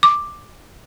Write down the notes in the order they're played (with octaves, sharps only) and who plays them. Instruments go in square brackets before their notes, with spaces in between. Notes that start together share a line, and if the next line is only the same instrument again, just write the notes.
[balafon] D6